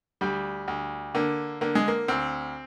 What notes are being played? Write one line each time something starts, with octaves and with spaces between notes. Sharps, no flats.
D2 G3
D2
D3 A#3
D3 A#3
G#3
A#3
D2 C4